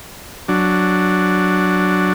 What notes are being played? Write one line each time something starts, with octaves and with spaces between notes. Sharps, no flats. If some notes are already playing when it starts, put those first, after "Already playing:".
F#3 D4